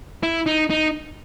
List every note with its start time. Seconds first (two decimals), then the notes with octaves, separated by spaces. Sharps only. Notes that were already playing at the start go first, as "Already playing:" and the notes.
0.23 E4
0.46 D#4
0.70 D#4